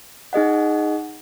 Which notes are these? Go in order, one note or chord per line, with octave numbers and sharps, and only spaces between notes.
D#4 G#4 D#5 F#5